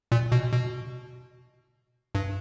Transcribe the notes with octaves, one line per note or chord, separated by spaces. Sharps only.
A#2
B2
B2
G2